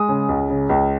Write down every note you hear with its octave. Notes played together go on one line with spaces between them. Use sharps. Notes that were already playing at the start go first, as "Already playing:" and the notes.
Already playing: G#3 D#6
C#3
C#2
C#3
C#2